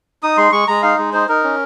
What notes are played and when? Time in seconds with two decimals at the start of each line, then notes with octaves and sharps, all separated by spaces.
0.23 D#4 D#6
0.38 G#3 C6
0.52 G#3 C#6
0.68 G#3 A#5
0.82 D#4 F5
0.98 G#3
1.13 D#4 C5
1.29 D#4 A#4
1.44 C#4